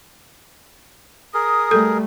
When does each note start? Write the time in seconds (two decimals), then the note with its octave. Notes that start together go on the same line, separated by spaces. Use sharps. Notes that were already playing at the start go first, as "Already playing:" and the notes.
1.34 G#4 A#4 D#6
1.71 G3 A3 A4